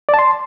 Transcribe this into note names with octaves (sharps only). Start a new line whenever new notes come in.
D5
A5
C6